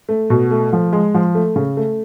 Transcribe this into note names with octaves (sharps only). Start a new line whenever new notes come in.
A3
B2
A3
F3
G#3
F3
A3
C#3
A3